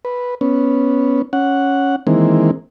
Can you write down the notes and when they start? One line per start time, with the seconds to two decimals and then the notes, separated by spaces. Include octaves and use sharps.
0.05 B4
0.41 B3 C#4
1.33 C#4 F#5
2.07 D#3 E3 G#3 A#3 C4